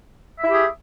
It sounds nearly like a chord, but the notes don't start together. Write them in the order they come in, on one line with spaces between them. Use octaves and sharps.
E5 E4 G4 G#4